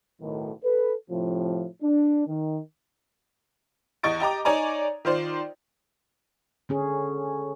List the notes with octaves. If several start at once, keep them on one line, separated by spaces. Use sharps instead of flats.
B1 A2 D#3
A4 B4
A2 C3 F3
D4
D#3
E2 D#5 C#6 A6 D7
G4 D#5 A#5 D6
D#4 C#5 D5 G#5 A#5
D#3 F4 C5 D5
D3 C#4 G#4